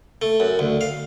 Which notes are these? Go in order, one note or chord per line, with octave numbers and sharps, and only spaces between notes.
A3
F#2
D2
F5